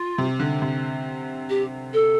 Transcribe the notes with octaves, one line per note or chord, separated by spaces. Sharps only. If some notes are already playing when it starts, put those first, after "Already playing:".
Already playing: F4
C3
D3
C3
G4
A4